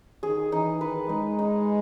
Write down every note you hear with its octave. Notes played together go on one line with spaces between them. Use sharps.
D#3 G#4
E3 D#4
D#3 B4
G#3 D#4
D#4